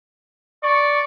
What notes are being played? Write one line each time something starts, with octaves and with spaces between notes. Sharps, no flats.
D5 C#6